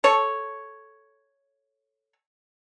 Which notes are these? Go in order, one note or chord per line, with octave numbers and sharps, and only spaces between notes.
A4 C#5